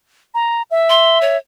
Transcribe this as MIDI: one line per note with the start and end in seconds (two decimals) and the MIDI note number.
0.34 0.62 82
0.71 1.37 76
0.90 1.18 84
1.21 1.37 73